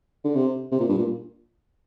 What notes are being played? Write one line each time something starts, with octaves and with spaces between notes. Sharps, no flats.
D3
C3
C3
A#2
G2
A#2